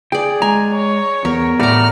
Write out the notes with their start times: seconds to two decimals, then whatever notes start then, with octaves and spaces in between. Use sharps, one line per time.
0.12 G#4 D5 G5
0.42 G#3 G#5 A#5
0.74 C#5
1.25 E2 B3 A#4
1.60 A2 G3 A3 F#4 D5 A#5 F6